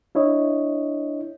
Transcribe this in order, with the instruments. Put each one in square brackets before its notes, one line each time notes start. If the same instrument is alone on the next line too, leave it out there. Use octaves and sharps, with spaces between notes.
[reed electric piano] D4 E4 C#5 D#5